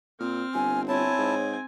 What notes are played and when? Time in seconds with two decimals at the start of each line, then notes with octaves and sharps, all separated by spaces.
0.20 A#2 C4 F6
0.54 G1 G#5
0.88 C4 E4 C#5 G#5 A5
1.19 G#2